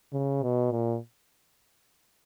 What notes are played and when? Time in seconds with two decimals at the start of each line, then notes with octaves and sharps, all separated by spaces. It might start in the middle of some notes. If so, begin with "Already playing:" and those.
0.13 C#3
0.42 B2
0.71 A#2